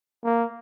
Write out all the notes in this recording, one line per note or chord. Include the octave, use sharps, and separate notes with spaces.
A#3